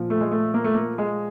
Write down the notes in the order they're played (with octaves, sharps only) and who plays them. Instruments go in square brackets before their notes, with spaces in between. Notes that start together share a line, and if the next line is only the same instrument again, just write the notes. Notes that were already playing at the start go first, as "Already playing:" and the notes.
Already playing: [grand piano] A#2 F3
A3
G#3
A3
A#3
A3
A#3
G#3